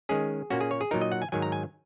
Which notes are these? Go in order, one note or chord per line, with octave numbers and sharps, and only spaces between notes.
D#3 G#3 C#4 G#4
A#2 A#3 C#4 F#4
G#4
C#5
G#4
A#2 F#3 D#4 A#4
D#5
F#5
G#5
G#2 D#3 F#3 G#5
A#5
G#5